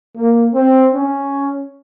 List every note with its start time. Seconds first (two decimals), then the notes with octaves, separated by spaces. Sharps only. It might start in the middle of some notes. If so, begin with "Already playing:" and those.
0.16 A#3
0.54 C4
0.93 C#4